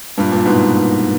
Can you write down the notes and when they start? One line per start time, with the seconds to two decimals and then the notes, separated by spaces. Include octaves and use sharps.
0.18 G2 A#2
0.32 G2 A#2
0.45 G#2 B2